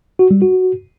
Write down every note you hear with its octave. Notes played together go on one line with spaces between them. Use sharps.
F#4
G3
F#4